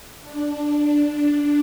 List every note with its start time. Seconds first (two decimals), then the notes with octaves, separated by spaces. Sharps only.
0.22 D4
0.52 D4